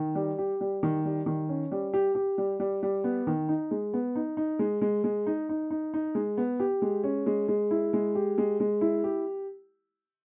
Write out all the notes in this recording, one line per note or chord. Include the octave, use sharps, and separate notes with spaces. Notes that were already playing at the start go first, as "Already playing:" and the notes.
Already playing: D#3
G3
G4
G3
D#3
G3
D#3
C#4
G3
G4
G4
G3
G3
G3
B3
D#3
D#4
G#3
B3
D#4
D#4
G#3
G#3
G#3
D#4
D#4
D#4
D#4
G#3
B3
G4
G#3
C#4
G#3
G#3
E4
G#3
G4
G#3
G#3
E4
G4